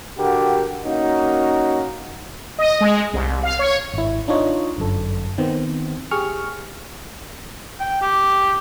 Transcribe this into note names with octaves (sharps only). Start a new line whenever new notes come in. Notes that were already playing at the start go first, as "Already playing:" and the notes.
D3 F#4 G4 A#4
A#3 C#4 D#4 F#4
D#5
G#3
C2
F5
C#5
G#1 E4
D4 D#4 F4 C#5 D#5
G1 F#2 A4
D#3 B3 C4
G4 G#4 C#6 F6
G5
G4